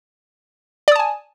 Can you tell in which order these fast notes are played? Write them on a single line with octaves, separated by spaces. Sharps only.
D5 D#6 A5 G#5